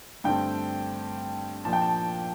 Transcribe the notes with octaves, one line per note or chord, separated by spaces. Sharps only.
G2 D3 A3 C4 G5
A#2 F3 A#3 D4 A5
G5
A5